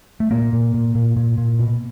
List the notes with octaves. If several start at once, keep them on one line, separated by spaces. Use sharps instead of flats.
A3
A#2 A#3
A#2
A#2
A#2
A#2
A#2
B2